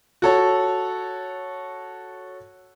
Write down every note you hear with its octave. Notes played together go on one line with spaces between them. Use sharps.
F#4 A4 C#5